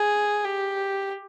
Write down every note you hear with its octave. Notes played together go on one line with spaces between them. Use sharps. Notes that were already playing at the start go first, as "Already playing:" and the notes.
Already playing: G#4
G4